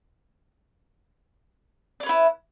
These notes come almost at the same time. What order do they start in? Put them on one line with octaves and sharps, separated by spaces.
D5 C#4 B4 E4